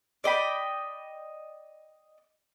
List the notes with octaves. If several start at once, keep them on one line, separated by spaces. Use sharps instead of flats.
D5 D#5 G5 B5